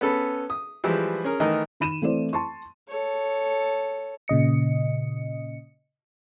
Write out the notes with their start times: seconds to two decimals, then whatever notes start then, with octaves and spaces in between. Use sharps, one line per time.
0.01 B3 C#4 A4 B4
0.50 D#6
0.84 E3 F3 G3 G#3 E4
1.24 C#4 G#4 A#4
1.40 D#3 E3 A3 D#4 A#4 D#5
1.80 D#3 B5 D#7 E7
2.02 E3 A3 C4 E4 C5 D5
2.33 A5 C6 C#6
2.88 A4 C#5
4.28 A#2 C#3 D#5 C#7